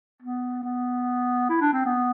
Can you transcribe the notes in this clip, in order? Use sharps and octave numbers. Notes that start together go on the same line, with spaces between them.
B3
B3
E4
D4
C4
B3